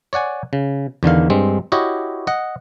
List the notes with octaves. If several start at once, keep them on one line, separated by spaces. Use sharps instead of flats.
C#5 D5 F#5 G#5
C#3
E2 D3 D#3 F5
G2 G#3 C4
E4 F#4 G4 C#5 D#5
D#5 F#5